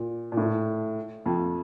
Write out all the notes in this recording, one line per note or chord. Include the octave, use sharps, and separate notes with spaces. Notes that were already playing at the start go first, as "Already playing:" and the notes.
Already playing: A#2
A#2
A2
F2